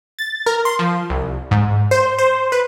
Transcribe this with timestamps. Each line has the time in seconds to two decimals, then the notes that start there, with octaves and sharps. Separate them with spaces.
0.19 A6
0.46 A#4
0.65 C6
0.79 F3
1.10 C2
1.51 G#2
1.91 C5
2.18 C5
2.52 B4